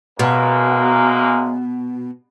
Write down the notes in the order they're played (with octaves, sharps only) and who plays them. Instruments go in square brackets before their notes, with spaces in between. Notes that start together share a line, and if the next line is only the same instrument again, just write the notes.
[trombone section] F#2 G#3 A#3 [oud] B2